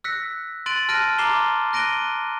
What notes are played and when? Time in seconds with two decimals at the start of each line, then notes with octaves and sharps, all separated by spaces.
0.04 E6 F#6 A#6 B6 C#7
0.66 C6 F#6 A6 D7 D#7 F#7
0.89 A5 F6 F#6 A#6 D7 D#7
1.18 A#5 C6 D6 C7 E7 G7
1.73 F#6 A#6 D7 D#7 G7